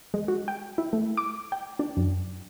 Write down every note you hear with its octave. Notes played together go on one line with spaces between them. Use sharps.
G#3
F#4
G5
E4
A3
D6
G5
D4
F#2